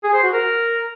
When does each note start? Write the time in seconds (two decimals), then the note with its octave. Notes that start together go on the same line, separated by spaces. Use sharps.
0.04 G#4
0.13 C5
0.23 F#4
0.33 A#4